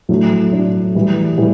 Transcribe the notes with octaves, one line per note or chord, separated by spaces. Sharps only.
A2 F#3 A3 D4
A2 F#3 A3 D4
A2 E3 G3
A2 E3 G3